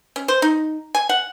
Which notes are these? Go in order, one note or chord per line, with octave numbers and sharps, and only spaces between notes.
C#4
C5
D#4
G#5
F#5